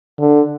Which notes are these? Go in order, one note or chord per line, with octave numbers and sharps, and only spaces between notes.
D3